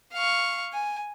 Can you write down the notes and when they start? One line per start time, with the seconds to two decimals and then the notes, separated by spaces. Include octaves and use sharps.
0.13 F5 C#6
0.73 G#5